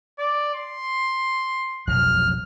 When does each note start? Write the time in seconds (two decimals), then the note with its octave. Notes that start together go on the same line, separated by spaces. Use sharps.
0.19 D5
0.54 C6
1.87 F1 B1 F#3 F6